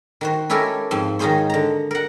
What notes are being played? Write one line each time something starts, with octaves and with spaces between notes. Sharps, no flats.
D#3 F#4 C5
C#4 E4 G4 A4 A#4 G#5
G#2 F3 C4
D#3 D#4 F4 G#4 C5 C#5
D3 A#5
A#4 F#5